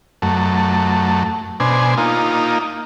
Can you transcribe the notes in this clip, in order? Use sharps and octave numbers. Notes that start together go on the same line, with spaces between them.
F#2 A3
B2 D4 C5 G#5
A#3 D#4 F4